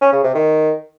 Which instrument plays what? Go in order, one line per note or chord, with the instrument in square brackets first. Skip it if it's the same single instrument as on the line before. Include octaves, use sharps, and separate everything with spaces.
[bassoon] C#4
C#3
C3
D#3